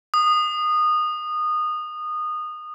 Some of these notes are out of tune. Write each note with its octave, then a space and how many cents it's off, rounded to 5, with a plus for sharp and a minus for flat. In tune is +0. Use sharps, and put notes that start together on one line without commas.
D#6 -20